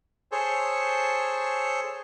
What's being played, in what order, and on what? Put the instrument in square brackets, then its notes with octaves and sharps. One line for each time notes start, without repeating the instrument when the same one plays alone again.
[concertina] G#4 A4 C5 C#5